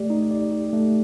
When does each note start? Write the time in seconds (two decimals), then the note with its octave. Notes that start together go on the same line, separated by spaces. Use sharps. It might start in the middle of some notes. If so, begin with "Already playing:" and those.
Already playing: A3 G4 D5
0.10 D#4
0.31 D5
0.52 G4
0.73 A3